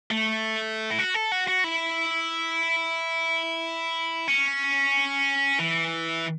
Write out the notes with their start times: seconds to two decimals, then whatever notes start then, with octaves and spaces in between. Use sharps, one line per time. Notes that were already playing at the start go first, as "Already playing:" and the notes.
0.11 A3
0.91 E4
0.99 F#4
1.14 A4
1.32 F#4
1.48 F#4
1.64 E4
4.28 C#4
5.59 E3